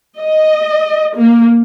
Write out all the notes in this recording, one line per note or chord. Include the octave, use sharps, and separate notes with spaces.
D#5
A#3